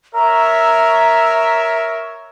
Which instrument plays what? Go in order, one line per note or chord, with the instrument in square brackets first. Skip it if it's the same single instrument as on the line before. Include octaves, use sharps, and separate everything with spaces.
[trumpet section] A#4 C#5 E5 [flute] A#5